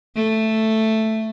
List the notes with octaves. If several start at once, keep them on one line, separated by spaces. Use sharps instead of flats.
A3